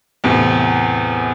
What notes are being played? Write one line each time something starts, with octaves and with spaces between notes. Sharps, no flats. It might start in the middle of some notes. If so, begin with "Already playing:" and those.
E2 A2 C3